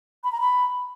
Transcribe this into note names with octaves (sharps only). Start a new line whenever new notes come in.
B5
A#5
B5